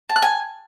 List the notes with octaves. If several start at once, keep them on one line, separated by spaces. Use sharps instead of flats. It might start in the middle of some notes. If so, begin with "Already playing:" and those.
A5
F#6
G#5